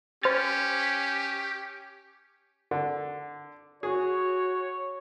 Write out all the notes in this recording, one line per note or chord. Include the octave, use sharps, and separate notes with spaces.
C#4 G4 C5 F6 A6
D3
F#4 G#4 C#5